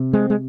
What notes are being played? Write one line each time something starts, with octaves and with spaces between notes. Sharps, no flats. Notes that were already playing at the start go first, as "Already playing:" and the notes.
Already playing: C3
G#3 C4
G#3